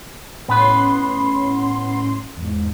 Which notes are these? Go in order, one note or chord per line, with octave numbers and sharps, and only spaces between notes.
A2 B3 C#4 B4 C6
E2 G#2